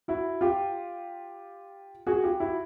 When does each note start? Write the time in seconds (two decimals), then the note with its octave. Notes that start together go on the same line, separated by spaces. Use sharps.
0.08 E4 F#4
0.41 F4 G4
2.07 F#4 G#4
2.23 F4 G4
2.40 E4 F#4